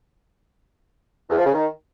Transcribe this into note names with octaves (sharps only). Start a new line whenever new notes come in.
E2
F3
C#3
D#3